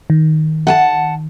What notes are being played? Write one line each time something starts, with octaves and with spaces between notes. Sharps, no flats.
D#3
F#5 G#5 A5